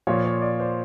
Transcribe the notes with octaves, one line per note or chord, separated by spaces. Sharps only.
A#2 F3 C#5
C#5
D5
C5